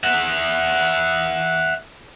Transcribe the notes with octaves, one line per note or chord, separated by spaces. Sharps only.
E5 F#5